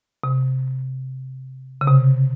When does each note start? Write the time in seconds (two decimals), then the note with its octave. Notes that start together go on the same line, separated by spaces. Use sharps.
0.24 C3
1.81 C#3
1.87 C3